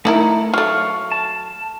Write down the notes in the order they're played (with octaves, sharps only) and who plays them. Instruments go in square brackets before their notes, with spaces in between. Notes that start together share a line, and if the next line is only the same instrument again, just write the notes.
[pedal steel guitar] A3 [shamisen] D#4 E4 A#4
[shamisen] F#3 A3 [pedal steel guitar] F5 C#6 F6
[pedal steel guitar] A5